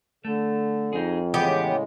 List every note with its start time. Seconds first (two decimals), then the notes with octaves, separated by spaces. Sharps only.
0.25 D3 A3
0.93 F2 D#4 G#4
1.34 A2 C#3 E3 G#3 B3 G4